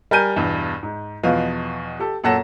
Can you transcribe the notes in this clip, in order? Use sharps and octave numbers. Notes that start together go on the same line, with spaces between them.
G3 A#4 G#5 G6 D#7
E2 G2 B2
G#2
E2 B2 F3 B4 D#5 F5
G4 A4
F#2 A#2 A4 F#5 A#6 E7